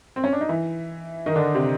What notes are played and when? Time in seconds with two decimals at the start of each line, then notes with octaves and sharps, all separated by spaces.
0.16 C4
0.24 C#4
0.33 D4
0.41 D#4
0.49 E3 E4
1.26 D#3 D#4
1.35 D3 D4
1.55 C3 C4